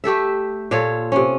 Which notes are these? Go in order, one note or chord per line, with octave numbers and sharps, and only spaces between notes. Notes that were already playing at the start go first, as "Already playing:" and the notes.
A3 G4 A4 E5
A#2 F4 A4 C#5
C3 C#4